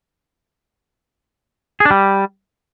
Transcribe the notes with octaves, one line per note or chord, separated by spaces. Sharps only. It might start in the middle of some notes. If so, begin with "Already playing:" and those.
G#4
D4
G3